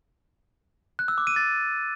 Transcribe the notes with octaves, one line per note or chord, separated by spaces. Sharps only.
F#6
E6
D6
D#7
A6